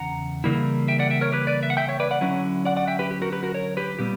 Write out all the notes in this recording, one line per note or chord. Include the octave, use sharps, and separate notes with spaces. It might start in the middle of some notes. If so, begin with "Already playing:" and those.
Already playing: E2 C#3 F#5 A#5
C#3 E3 G3 A#3 E4
E5 G5
D5 F#5
E5 G5
A#4 C#5
G4 B4
B4 D5
E5
F#5
E5 G5
C#5 E5
B4 D5
D5 F#5
D3 F#3 C#4 E4
D5 F#5
D5 F#5
E5 G5
G4 B4
G4
F#4 A#4
G4 B4
F#4 A#4
A#4 C#5
G4 B4
A#2 G3 B3 G4